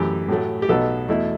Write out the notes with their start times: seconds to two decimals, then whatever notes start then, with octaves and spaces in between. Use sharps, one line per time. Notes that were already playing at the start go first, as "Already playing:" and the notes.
Already playing: F#2 E3 A3 G4
0.28 A2 F#3 A3
0.62 G4
0.69 B1 B2 F#3 B3 A4
1.08 E2 B2 A3 E4